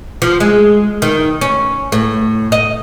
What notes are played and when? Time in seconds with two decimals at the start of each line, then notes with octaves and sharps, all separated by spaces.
0.22 F3
0.40 G#3
1.02 D#3
1.41 C#4
1.92 A2
2.52 D#5